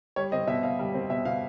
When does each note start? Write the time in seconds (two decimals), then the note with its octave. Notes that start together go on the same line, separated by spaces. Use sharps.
0.16 G3 C#5
0.32 C4 D#5
0.47 B2 E5
0.63 B2 F5
0.79 G3
0.94 C4
1.10 B2 E5
1.25 B2 F5